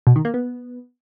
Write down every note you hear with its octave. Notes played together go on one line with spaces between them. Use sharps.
B2
D#3
A#3
B3